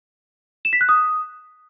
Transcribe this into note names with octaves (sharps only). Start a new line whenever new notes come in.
E7
B6
F#6
D#6